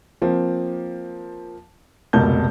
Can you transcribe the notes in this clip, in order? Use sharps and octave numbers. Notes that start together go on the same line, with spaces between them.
F3 A#3 C4
F1 C#2 B2 A#4 A5 G6